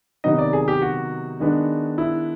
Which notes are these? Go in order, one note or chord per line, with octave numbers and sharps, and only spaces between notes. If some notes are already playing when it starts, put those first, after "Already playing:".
C3 D#3 F#3 B3 D#4 D#5
D5
G#4
G4
F#4
D#3 G#3 B3 D4
E4